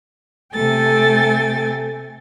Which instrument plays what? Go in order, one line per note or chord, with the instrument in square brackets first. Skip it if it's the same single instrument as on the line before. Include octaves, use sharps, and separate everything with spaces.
[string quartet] C3 A3 A4 G5 G#5 A6